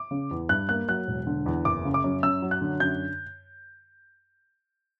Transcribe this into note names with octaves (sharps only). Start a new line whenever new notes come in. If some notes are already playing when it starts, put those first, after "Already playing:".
Already playing: D6
C#3
E2
G2 F#6
A#3 F#6
F#3 F#6
E1
D3
E2
F#1 D6
C#3
D6
F#2
F#2 E6
F#3
F#6
D3
F#2 G6